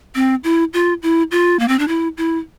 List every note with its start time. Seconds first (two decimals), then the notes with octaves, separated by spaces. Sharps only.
0.15 C4
0.44 E4
0.73 F4
1.03 E4
1.31 F4
1.59 A#3
1.68 C4
1.79 D4
1.88 E4
2.17 E4